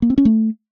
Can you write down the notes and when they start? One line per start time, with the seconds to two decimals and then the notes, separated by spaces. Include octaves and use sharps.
0.02 A#3
0.10 C4
0.18 C#4
0.25 A3